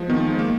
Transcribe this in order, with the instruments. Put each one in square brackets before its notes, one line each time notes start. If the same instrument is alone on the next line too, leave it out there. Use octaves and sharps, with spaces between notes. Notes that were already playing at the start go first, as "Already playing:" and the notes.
Already playing: [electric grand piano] F3 G#3
[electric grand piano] D#3 [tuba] B3
[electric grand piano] G#3
A#3